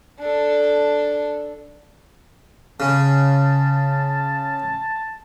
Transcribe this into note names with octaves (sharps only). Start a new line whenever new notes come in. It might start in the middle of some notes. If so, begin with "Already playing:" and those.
D4 A4
C#3 A5